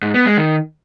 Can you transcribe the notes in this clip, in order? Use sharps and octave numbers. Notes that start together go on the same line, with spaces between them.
G#2
B3
G#3
D#3